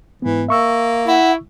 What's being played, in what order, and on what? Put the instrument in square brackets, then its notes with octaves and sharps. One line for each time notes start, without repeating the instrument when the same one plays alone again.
[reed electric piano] G#2 B3 [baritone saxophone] E3
[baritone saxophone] A#3 [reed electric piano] E5 C#6 E6
[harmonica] E4 [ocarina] F#5